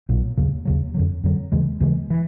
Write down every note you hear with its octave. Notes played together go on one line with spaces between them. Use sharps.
B1 A#2 F#3
D#2 C#3 F#3
D#2 C#3 F#3
F2 D3 F#3
F2 D3 F#3
D#2 C#3 E3 G#3
D#2 C#3 E3 G#3
E3